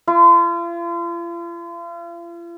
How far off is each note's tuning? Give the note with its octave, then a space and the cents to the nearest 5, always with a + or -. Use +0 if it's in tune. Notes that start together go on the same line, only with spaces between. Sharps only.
F4 -40